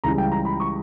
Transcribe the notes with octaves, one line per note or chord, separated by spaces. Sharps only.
C#2 C#3 E3 G3 A#5
G5
A#5
B5
C#6